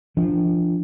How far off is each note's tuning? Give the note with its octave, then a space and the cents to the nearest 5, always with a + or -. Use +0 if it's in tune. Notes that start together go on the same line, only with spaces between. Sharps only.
F3 -20 D4 +0